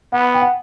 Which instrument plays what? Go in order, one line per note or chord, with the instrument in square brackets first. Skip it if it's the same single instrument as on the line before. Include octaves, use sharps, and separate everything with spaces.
[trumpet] B3 [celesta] F#5
[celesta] G5
F#5